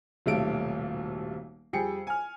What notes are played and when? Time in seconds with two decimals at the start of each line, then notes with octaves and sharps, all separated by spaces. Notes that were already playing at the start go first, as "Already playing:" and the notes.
0.26 D#1 B1 C3 A3 F5 D7
1.73 F2 G3 G#4 G5 C#7
2.07 G#5 F6